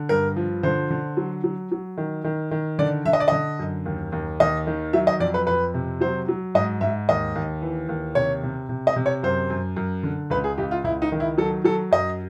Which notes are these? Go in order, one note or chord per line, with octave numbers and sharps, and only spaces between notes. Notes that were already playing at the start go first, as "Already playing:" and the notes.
Already playing: D3
G2 A#4
F3
D3 C5
D3
F#3
F#3
F#3
D#3
D#3
D#3
D3 D5
D3 E5
D#5
D5
D3 D#5
F#2
D#2
D#2
D#2 D#5
D#3
F#3 E5
D#5
F2 D5
B4
F2 B4
C3
F#3 C5
F#3
G#2 D#5
G#2 E5
D#2 D#5
D#2
E3
D#2
C3 C#5
C3
C3
D#5
C3
C#5
F#2 C5
F#2
F#2
D3
C#2 B4
G#4
C#2 G4
F4
C#2 E4
D#4
D#3
E4
F#3 A4
F#3 A4
F#2 D#5